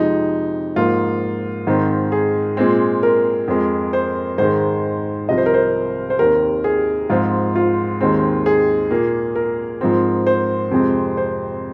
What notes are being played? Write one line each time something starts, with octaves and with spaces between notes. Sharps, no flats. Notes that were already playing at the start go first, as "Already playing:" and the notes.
Already playing: F2 C3 F3 G#3 D#4
G#2 F3 A#3 F4
G#2 D#3 C4
G#4
A#2 G#3 C4
A#4
F2 F3 G#3
C5
G#2 D#3 G#3 C5
C2 C3 F3 D#5
C5
A#4
C5
C5
D#2 D#3 C4 A#4
G#4
G#2 F3 C4 F4
F4
D#2 D#3 G#3 C4
G#4
A#2 A#3
A#4
G#2 F3 C4
C5
F2 C3 G#3 C4
C5